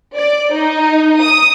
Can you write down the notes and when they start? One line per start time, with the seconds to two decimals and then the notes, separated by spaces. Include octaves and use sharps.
0.14 D5
0.53 D#4
1.18 D#6